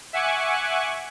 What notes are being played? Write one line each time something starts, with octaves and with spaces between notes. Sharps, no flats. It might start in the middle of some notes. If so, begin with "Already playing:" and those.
E5 F#5 G#5 C#6 D6 F#6